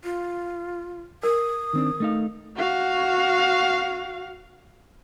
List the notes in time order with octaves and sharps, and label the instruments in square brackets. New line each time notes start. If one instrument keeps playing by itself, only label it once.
[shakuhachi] F4
[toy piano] A#4 [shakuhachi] D#6
[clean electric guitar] D#3 C4 D4
A3 D#4 F5
[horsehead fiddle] F#4 F5